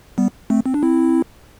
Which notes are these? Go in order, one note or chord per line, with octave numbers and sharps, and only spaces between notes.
G3 B3
A3 C4
C4
D4
C4 E4